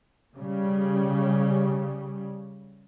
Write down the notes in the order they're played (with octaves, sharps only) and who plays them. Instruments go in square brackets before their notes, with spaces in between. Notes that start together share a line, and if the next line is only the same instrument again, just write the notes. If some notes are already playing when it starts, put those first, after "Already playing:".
[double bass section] C#3 G3